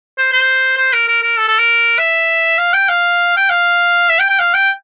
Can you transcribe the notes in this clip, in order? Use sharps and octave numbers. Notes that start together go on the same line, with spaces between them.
C5
C5
C5
A#4
A#4
A#4
A4
A4
A#4
E5
F5
G5
F5
G5
F5
E5
G5
G5
F5
G5